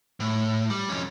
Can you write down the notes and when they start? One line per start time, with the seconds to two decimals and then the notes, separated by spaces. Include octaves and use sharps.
0.20 A2
0.70 G3
0.89 F2 C#4